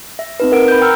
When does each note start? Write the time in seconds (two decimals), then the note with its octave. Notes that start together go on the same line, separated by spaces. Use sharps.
0.19 E5
0.40 C4 D#4 B4
0.52 A#4 F#5 D7
0.68 B5 G6
0.81 G5 A#5 E6 F6